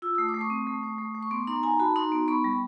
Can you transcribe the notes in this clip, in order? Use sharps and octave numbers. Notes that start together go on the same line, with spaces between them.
F4 E6
A3 D#6
D6
A3
C#6 D#6
C4
A3
A3
A3
A3
C#6
B3 C6 D6
D#4 A#5 C6
D#4 G#5 A#5
F#4 A5 B5
D#4 A#5 C6
B3
B3 B5 C#6
G3